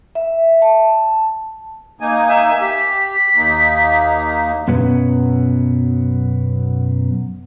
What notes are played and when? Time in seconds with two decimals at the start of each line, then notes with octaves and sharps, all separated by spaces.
0.15 E5
0.62 A5
2.01 A#3 D#4 G#5
2.28 E5
2.61 G4 B6
3.36 D#2 A#3 D#4
4.68 F#2 B2 F#3 B3